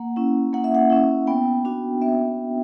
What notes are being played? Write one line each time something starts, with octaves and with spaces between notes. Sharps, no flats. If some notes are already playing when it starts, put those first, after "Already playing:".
Already playing: A#3 F#5
C#4 E4
A#3 F#5
E5
F#5
C#4 E4
B3 G5
D4 F#4
B3 E5